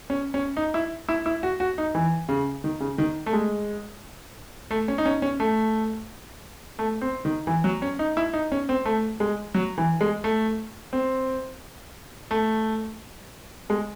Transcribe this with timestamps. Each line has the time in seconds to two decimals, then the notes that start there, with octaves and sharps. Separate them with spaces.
0.10 C#4
0.34 C#4
0.57 D#4
0.74 E4
1.09 E4
1.26 E4
1.43 F#4
1.60 F#4
1.78 D#4
1.95 E3
2.29 C#3
2.64 D#3
2.80 C#3
2.98 D#3
3.26 A3
3.33 G#3
4.71 A3
4.88 C#4
4.98 D#4
5.06 C#4
5.22 C#4
5.40 A3
6.79 A3
7.01 C4
7.25 D#3
7.47 E3
7.64 F#3
7.82 C#4
7.99 D#4
8.17 E4
8.33 D#4
8.52 C#4
8.69 C4
8.85 A3
9.20 G#3
9.54 F#3
9.78 E3
10.01 G#3
10.24 A3
10.93 C4
12.31 A3
13.70 G#3